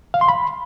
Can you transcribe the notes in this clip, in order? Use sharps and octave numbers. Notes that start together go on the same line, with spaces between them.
F5
C6
B5